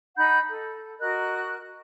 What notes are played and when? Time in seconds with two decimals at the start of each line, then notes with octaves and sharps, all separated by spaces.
0.17 D#4 F#5 B5 G6
0.49 A4
0.99 F#4 A#4 D#5 F#6